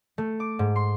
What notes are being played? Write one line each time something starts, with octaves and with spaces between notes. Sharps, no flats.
A3
D6
G#2
C6